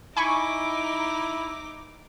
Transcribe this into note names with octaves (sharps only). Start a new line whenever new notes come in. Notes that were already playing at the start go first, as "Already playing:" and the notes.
D#4 E4 G#5 B5 C#6 D6